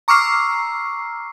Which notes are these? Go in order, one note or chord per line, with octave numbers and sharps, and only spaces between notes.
A#5 C#6 D6 E6 F6 C7